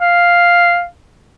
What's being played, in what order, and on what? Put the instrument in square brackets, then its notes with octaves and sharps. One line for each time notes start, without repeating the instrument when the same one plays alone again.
[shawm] F5